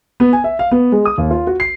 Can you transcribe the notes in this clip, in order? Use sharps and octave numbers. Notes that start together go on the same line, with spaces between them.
B3
G#5
E5
F5
B3
G#3
D#6
D#2
F4
F#4
C7